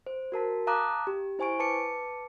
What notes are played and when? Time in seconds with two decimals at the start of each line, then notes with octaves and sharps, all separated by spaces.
0.07 C5
0.32 F#4 A#4 A5 B6
0.67 F5 A5 A#5 D6 D#6 F#6
1.07 G4
1.39 E4 C5 G#5 C#6 D7
1.59 B4 A5 D6 C#7